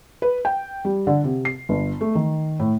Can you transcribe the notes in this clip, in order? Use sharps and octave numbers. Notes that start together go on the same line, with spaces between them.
B4
G5
G3
D3
C3
C7
G1
A3
D#3
A2